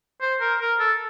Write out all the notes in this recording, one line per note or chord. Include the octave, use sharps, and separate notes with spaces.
C5
A#4
A#4
A4